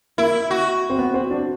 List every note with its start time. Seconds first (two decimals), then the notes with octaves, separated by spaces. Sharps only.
0.18 A#3 E4
0.51 F#4
0.90 C4
0.98 B3
1.14 C4
1.31 D4